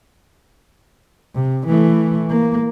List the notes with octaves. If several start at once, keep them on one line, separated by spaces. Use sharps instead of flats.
C3
E3 A3
A#3